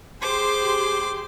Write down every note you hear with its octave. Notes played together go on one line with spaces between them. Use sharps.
G4 G#4 C5 C6 D6